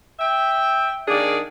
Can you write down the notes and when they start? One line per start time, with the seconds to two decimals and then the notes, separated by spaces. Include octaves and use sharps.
0.20 E5 G5
1.08 D#3 A#3 D4 G#4 D5